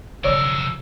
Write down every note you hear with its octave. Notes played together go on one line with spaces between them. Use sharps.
B1 C#3 F3 A#4 C#5 D5 E6